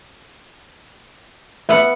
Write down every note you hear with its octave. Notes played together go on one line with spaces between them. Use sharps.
B3 E5 F#5